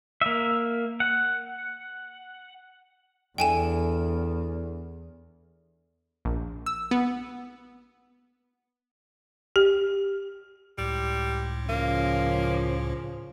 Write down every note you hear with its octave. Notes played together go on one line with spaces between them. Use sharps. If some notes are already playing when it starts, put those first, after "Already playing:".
A#3 E5
F#5
E2 D4 E4 A4 G5 G#5 E7
A#1
E6
B3
G4
C#2 A2 G3
C#3 F3 A#3